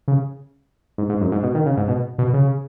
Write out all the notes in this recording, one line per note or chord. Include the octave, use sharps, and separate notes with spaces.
C#3
G#2
G#2
F#2
G#2
B2
D#3
C#3
G#2
B2
B2
C#3